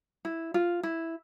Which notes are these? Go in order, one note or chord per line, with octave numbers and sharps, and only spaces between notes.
E4
F4
E4